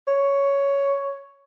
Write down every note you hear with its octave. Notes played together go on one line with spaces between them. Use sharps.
C#5